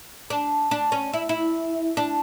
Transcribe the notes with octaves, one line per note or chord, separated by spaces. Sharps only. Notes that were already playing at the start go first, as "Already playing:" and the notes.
D4
D4
C#4
E4
E4
D4